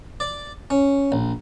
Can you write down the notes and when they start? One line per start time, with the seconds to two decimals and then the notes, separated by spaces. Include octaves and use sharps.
0.20 D5
0.70 C#4
1.12 A#1